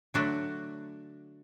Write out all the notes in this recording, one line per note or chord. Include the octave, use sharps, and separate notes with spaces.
D3 F#3 A3 D4 F#4